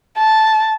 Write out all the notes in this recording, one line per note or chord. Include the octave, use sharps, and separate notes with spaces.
A5